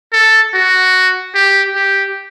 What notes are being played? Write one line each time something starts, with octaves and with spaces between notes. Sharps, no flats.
A4
F#4
G4
G4